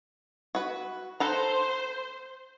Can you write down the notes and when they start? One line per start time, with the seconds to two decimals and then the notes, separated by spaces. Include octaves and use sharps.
0.55 F#4 B4
1.20 A4 B4 C5 A#5